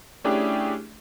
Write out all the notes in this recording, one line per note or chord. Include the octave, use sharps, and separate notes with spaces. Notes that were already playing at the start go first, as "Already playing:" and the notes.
A3 C#4 D4 E4 G4 G#4